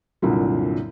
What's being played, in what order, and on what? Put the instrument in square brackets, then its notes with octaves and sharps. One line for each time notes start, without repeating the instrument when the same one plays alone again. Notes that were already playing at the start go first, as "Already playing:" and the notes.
[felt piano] C2 F#2 A#2 D3